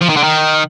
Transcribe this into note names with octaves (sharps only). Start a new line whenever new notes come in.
F3
D#3
D3
D#3